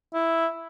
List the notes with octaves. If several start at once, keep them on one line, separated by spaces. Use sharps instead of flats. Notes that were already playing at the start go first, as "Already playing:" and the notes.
E4